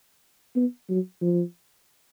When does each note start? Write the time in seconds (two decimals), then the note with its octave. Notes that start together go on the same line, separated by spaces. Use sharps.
0.56 B3
0.90 F#3
1.21 F3